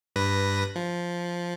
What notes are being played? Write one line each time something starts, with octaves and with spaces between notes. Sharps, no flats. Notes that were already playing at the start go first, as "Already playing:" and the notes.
G2 B4 A#6
F3